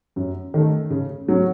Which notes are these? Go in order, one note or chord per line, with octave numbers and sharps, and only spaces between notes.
F#2
D#3 A3
C#3
F#3 C#4